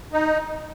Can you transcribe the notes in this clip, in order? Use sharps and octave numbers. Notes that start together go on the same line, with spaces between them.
D#4